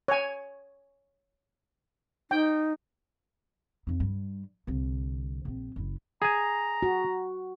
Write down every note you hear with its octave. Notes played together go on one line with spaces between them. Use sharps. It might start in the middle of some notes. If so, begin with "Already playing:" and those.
C#5 G#5
D#4 G5
F2 D#4
G2 G3
C2 D3
A#1 C4
F#1 E4
G#4 G#5 A#5
F#4